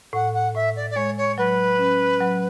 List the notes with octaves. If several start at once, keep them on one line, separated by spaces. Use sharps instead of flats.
A2 F#5
F#5
A2 E5
D5
D5
G#3 C#5
C#5
F#3 B4
C#4
F#3